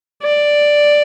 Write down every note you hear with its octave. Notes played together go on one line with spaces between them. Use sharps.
D5